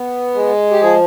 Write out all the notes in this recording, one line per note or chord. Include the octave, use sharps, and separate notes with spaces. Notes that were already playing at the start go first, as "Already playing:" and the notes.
Already playing: B3
G#3
G4
F3 G#4